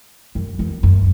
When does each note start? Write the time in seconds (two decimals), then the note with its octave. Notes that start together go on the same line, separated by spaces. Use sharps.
0.35 F#2
0.59 E2
0.83 F#2